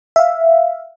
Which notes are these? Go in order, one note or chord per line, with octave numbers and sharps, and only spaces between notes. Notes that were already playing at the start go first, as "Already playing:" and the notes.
E5 F5